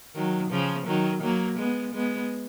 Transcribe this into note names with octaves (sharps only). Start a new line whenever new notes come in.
D#3 F#3
C#3 F3
D#3 F#3
F#3 A#3
G#3 B3
G#3 B3